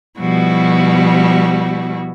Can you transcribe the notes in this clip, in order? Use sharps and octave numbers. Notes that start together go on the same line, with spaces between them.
B2 F3 G3 E4 F#4